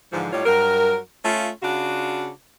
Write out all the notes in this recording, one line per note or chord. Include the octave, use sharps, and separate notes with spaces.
G#2 D3 E3 F3
A2 G3 D#4 F4 C#5
G2 F#3 A#4
A3 C#4 F4
C#3 D4 F4 F#4